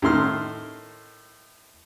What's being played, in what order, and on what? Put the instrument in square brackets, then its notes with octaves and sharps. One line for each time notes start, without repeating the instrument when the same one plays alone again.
[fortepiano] A2 D#3 C6 F6